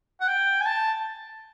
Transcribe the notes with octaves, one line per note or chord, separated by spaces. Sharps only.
F#5
G5
G#5
A5